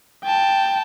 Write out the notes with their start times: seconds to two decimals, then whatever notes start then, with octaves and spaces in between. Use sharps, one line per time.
0.24 G5 A5